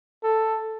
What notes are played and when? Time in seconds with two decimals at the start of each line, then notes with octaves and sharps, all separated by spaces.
0.24 A4